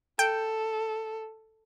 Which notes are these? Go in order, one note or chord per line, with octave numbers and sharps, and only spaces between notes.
A4 G5